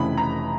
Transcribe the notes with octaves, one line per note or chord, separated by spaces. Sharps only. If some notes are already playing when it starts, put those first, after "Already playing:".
Already playing: F1 F2 C#3 E3 B5
A#5